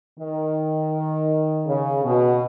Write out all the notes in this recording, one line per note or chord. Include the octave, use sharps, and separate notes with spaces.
D#3
C#3
B2